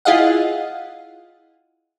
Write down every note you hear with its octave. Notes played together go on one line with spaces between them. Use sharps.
E4 F4 G#4 D#5 F5 F#5